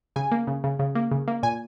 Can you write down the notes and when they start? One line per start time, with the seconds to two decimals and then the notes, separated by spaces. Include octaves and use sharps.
0.16 C#3 G#5
0.32 A#3
0.47 C#3
0.64 C#3
0.79 C#3
0.95 A#3
1.11 C#3
1.28 A#3
1.43 A#2 G#5